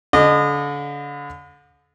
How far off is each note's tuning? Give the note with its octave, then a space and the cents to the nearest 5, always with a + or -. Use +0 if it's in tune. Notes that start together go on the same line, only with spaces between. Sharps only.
D3 -35 D#5 -25 D6 +35